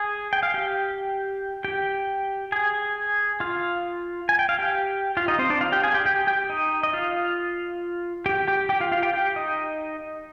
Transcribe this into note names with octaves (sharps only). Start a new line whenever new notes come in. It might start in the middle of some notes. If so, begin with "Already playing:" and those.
Already playing: G#4 G#5
G5
F5
G4 G5
G4 G5
G#4 G#5
F4 F5
G#5
G5
F5
G4 G5
F4 F5
D#4 D#5
C4 C5
D4 D5
F4 F5
G4 G5
G#4 G#5
G4 G5
G4 G5
G4 G5
D#4 D#5
D#5
F4 F5
G4 G5
G4 G5
G4 G5
F4 F5
F4 F5
G4 G5
G4 G5
D#4 D#5